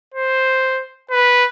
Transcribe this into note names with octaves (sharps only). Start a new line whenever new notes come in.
C5
B4